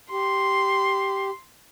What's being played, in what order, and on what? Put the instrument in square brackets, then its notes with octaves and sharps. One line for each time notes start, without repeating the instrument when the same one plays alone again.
[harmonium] G4 [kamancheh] C6